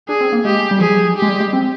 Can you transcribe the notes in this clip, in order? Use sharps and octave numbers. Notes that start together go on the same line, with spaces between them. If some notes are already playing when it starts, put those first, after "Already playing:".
D4 G#4
C4
A#3
G#3 G4
G3
F3 G#4
G4
G#3
G3
G#3
C4